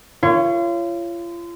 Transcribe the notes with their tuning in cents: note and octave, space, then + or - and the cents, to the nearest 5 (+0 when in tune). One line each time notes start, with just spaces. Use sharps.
F4 -35 C#5 +0